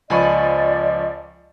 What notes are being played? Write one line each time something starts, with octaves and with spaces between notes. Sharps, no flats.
C#2 F3 D5 D#5 G#5 A5 B5 C#6